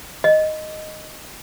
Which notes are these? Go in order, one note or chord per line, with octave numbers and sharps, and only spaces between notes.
D#5